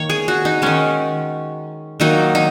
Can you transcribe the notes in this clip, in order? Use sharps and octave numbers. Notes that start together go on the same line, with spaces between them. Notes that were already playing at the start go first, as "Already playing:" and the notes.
Already playing: D#3 A#3 C#5
G#4
F#4
D#4
D#3 G#3 C#4
D#3 F#3 A#3 D#4
D#4